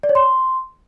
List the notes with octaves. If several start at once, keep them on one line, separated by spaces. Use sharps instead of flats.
D5
C#5
C6